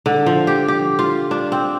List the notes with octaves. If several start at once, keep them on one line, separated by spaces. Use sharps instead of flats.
D3
F3
G4
G4
F4
D4
C4